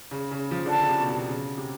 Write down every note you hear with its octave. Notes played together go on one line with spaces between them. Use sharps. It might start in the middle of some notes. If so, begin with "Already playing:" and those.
C#3
C#3
F3
D3 A5
C#3
C3
B2
C3
C#3
C3